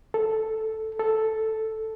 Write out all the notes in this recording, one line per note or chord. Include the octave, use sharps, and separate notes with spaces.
A4
A4